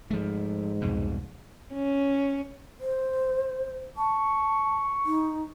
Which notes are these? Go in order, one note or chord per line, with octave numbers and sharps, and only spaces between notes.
G#2 F3 A3
C2 F2 B2
C#4
C5
A5 C#6
D#4